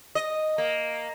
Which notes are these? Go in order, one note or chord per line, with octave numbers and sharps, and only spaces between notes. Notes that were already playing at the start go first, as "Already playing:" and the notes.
D#5
A#3